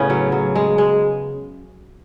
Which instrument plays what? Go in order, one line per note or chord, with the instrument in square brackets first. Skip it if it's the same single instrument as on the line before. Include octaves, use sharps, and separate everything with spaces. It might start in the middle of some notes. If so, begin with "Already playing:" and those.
Already playing: [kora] A2 C#3 A3 B3 C#4
F#3
F#3
G#3
G#3